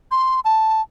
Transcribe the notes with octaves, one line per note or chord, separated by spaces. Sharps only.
C6
A5